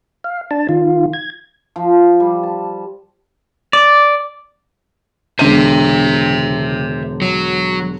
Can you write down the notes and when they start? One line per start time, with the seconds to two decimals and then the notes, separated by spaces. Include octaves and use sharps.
0.24 F5
0.51 D4 A5
0.69 D#3 F4
1.13 G#6
1.76 F3
2.20 G3
2.43 A5
3.73 D5
5.39 E1 D3 C5 E5 D#7
7.22 F#3